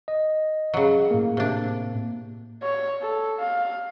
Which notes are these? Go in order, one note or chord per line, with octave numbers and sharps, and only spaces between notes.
D#5
C#3 F#3
A2 A#3
C3 D4
C#5
A4
F5